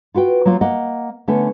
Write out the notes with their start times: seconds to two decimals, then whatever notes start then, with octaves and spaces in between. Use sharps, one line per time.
0.14 F4 F#4 B4 G5
0.45 F#3 A#3 F4
0.61 A#3 D#5 F#5
1.28 D3 A3 B3 C#4